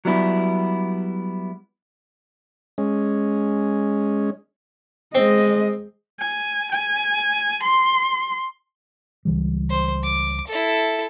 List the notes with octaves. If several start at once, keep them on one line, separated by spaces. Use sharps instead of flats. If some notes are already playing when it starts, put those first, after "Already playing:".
F#3 G3 B3 E4
G#3 C#4
G#3 C4 D#5
G#5
G#5
C6
C#2 E3 G3
C5
D6
E4 A4